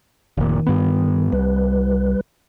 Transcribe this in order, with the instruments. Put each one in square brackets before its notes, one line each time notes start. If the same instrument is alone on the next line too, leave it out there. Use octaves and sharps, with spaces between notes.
[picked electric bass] F1 A#2 [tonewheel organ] D#3
[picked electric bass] G2 B3
[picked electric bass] C2 [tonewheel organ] G3 B4